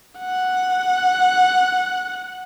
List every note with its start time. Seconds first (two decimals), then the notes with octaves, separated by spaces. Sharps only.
0.19 F#5